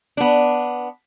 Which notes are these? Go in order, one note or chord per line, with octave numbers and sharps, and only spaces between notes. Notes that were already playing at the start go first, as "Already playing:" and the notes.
B3 D4